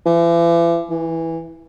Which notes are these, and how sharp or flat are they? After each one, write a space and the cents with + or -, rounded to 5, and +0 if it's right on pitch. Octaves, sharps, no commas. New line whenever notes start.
E3 +40
E3 -10